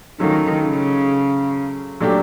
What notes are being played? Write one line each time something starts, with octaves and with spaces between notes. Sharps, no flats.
D#3 F#3 A3 C#4 F4
C#3
A#2 F#3 A3 D4 G4